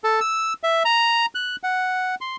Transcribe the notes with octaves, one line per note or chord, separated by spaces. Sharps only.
A4
E6
E5
A#5
F#6
F#5
C6